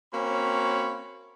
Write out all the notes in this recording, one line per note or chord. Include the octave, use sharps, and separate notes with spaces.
A#3 C4 C#4 F#4 C#5 B5